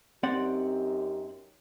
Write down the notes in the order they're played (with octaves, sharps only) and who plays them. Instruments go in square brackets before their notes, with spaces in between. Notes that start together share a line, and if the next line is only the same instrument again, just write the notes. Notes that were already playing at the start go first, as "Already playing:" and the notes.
[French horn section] F#2 D#4 G4 [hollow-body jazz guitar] C4 D5 F#5